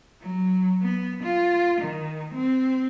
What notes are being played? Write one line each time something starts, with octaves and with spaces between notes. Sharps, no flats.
F#3
B3
F4
D#3
C4